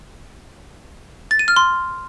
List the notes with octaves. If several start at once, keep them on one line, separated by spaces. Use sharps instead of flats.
A6
D#7
F6
C6